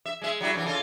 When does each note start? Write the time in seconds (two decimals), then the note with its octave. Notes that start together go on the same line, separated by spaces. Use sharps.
0.06 E5
0.22 G#3 E5
0.41 F#3 G3 E4
0.55 F#2 E3
0.66 C#3 F4 A4